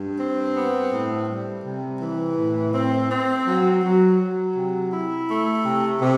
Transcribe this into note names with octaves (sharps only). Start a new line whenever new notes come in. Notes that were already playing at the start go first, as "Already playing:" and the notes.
Already playing: G2
C4
B3
A2
G3
C3
E3
A2
C4
C4
F#3
F#3
F#3
C3
E4
A3
C3
C3